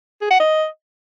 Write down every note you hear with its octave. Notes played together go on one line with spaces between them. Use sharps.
G#4
F#5
D#5